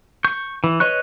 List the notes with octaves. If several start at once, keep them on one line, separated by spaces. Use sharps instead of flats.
C#6 G6
E3
B4 C#5 D#5 C#6 F#6